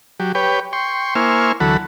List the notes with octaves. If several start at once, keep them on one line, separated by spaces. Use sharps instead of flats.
F#3 G4
G4 B4 C#5 G5
G5 C6 C#6
A#3 E4 C5 G#5 C#6 F6
D2 E3 F#3 A4 F#5 B5